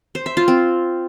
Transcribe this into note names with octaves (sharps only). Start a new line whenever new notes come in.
C5
E5
F4
C4